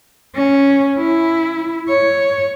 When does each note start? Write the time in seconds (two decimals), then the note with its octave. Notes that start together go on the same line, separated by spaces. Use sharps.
0.35 C#4
0.98 E4
1.89 C#5